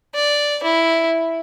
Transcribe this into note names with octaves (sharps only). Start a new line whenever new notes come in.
D5
E4